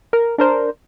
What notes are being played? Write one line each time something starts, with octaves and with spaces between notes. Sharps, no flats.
A#4
D4 A#4 C5